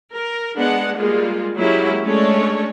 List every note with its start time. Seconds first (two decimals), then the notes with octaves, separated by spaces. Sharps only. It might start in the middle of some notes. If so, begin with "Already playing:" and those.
0.14 A#4
0.56 G#3 B3 D4 F#5
0.96 G3 G#3 A#3 F4 G#4
1.55 F#3 G#3 A#3 C#4 E4 G4
2.03 G#3 A3 C#4 D4 C#5